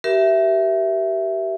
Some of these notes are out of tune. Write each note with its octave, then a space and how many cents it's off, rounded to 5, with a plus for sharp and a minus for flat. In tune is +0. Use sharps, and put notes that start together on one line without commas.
G4 -30 A#4 +20 E5 +5